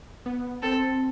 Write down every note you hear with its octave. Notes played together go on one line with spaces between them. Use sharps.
B3
C4 A4